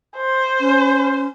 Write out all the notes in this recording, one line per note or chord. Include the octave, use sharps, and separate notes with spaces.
C5
C#4